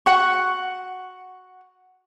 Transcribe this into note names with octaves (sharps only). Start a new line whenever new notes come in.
F#4 F#5 C#6